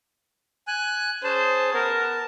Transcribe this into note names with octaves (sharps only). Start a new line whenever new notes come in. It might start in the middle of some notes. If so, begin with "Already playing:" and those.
G#5 F#6
C#4 G#4 C5 A5
B3 A#4